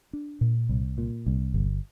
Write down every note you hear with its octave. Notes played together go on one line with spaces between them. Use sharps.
D4
A#2
C2
A#2
C2
G1